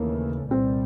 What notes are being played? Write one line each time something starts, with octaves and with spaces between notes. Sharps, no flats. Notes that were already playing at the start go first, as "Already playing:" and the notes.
Already playing: D#2 C#3 E3 A3 A#3
C2 A#2 G3 C4